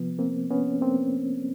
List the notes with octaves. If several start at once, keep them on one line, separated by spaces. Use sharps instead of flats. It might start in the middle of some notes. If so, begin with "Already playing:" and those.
Already playing: C3 F3 B3
A#3 C4
B3 C#4
A#3 C4